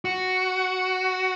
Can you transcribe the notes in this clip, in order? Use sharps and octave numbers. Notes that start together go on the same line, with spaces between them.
F#4